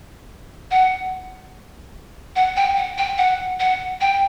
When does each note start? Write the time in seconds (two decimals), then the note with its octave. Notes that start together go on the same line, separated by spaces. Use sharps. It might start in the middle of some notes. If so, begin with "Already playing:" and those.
0.71 F#5
2.36 F#5
2.57 G5
2.77 F#5
2.98 G5
3.18 F#5
3.60 F#5
4.01 G5